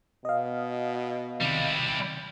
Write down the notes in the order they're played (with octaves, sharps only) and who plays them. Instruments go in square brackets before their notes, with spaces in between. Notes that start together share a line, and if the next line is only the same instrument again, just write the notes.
[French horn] B2 [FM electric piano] D#5 F5
[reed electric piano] C3 D#3 [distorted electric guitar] G3 E4